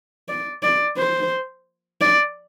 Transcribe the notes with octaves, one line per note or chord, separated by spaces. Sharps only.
D5
D5
C5
D5